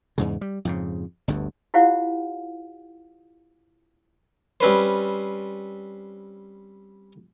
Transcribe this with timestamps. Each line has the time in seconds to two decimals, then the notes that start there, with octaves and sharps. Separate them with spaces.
0.18 E2 G#2 C#3
0.41 G3
0.65 F2 G#2 C#3
1.28 G1 D2 G2
1.74 E4 F4 G4 C5 F5 F#5
4.61 G3 C4 C#4 B4 C5